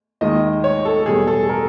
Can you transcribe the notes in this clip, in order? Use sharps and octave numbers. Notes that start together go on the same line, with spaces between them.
D#2 D#3 G#3 D#5
C#5
A4
E2 B2 G3 G#4
A4
A#4